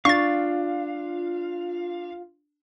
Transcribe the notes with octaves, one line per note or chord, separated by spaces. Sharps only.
D4 F4 F5 C#6 A6